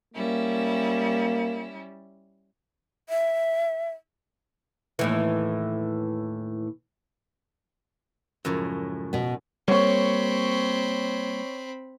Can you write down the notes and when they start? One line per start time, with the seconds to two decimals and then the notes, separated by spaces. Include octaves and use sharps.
0.14 G3 A#3 C#4 E4
3.09 E5
4.99 D#2 A2 E3
8.45 C#2 F#2 A2 F3
9.13 B2 B3
9.68 G3 A#3 C4 C#5 B5 C#6